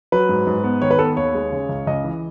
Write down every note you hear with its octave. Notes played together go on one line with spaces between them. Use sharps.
F#3 B4
G#2
G#2
B3
D#3 C#5
B4
B3 A4
D#2 C#5
G#3
C#3
C#2
C#2 D#5
E3